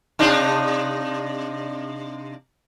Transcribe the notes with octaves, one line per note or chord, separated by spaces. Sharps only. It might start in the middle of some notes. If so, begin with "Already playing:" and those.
C3 D4 D#4